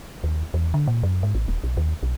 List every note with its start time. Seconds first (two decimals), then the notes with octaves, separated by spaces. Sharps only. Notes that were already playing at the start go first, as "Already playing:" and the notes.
0.24 D#2
0.54 E2
0.74 D3
0.87 A#2
1.03 F#2
1.23 G#2
1.35 A1
1.48 D#1
1.64 B1
1.77 D#2
2.03 B1